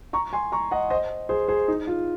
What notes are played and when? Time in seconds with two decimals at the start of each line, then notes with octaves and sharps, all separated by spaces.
0.13 A#5 C#6
0.33 G#5 C6
0.52 A#5 C#6
0.71 D#5 F#5
0.90 C5 D#5
1.29 G#4 C5
1.48 G#4 C5
1.68 D#4
1.87 F4